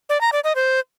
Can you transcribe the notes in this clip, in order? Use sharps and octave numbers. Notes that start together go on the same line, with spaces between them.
D5
A#5
D5
D#5
C5